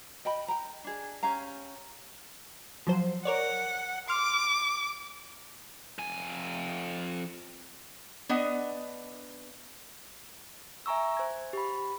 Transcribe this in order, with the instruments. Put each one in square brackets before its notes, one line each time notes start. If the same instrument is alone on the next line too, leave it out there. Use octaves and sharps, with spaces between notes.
[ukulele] D#5 G5 B5
G5 A#5
D4 G#4
C#4 G4 F5 A#5
[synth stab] F3 F#3 C5
[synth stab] A#4 C#5 D5 [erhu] F#5
[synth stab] C6 F6 [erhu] D6
[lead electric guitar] F2 G#5
[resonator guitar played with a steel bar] B3 D4 D#5 F#5
[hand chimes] E5 G#5 A#5 C#6 E6
C5 G#6
G4 B5